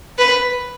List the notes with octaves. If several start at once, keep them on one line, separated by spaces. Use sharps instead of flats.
B4